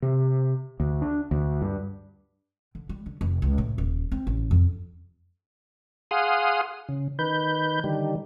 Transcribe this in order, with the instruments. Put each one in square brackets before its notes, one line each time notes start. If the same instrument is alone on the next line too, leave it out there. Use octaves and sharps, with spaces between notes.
[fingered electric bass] C3
D2
D4
D2
G2
[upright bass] D3
G3
D3
F1
C#2
A2
D#1
C4
A1
F2
[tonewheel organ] G#4 F5 F#5 C6 D#6
C#3
D#3 B4 G6
D3 D#3 G3